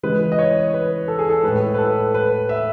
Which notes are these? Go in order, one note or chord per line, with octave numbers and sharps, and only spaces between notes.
C#3 E3 G#3 B4
D#5
C#5
B4
A4
G#4
A4
A2 G#3 B4
B4
A4
B4
E5